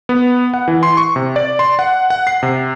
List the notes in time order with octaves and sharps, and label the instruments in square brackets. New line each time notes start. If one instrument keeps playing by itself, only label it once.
[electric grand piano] B3
F#5
E3
C6
C#6
C3
D5
C6
F#5
F#5
C7
C3